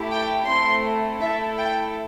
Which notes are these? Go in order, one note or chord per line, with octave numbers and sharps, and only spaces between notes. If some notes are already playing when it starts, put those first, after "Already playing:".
Already playing: A3 E4 G4
G5
A3 C4 E4 C6
A3 E4 A4 E5
G5